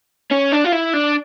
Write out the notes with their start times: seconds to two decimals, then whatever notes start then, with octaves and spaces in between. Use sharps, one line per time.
0.31 C#4
0.52 D4
0.64 F4
0.72 E4
0.93 D4